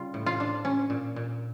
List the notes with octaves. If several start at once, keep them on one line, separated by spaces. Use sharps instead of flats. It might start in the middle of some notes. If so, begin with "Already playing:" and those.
Already playing: C#3 G3 F4
A2
F4
D4
C#4
A#2
A#2